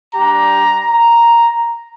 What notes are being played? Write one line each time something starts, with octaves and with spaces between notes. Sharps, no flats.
G3 D4 G4 A#5
A#5